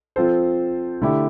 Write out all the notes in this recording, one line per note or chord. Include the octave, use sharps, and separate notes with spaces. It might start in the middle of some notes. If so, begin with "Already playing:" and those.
F3 C4 F4 A4 C5
D3 A3 E4 G4